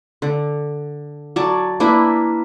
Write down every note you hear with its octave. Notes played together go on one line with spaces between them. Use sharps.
D3
F#3 D5 A5
A#3 D4 E4 B4